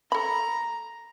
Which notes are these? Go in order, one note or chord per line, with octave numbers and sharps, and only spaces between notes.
A4 A#5 B5